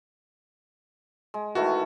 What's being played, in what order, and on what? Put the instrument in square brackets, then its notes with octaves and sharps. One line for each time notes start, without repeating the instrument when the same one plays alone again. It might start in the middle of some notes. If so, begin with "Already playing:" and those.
[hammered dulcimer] G#3
[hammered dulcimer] D#3 E3 A3 [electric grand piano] F#4